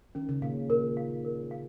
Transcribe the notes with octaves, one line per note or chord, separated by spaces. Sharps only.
D#3 C#4
C#3
A#2 F5
A#2 A#4
F5
A#4
F5